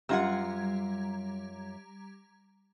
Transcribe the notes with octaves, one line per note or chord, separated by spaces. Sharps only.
F#2 G3 F4 F#5 A#5 G#6